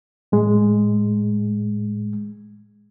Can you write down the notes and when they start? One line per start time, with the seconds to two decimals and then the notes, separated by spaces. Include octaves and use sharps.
0.32 A2 G#3